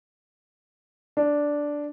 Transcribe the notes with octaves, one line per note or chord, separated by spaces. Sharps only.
D4